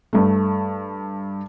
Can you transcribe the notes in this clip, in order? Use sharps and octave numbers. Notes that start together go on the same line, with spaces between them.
G2 A3